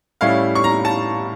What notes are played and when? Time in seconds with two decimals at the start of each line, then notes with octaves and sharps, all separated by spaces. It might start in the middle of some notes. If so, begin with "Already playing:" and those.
0.21 A2 G3 C#4 E4 F5
0.55 C#6
0.64 A#5
0.85 A5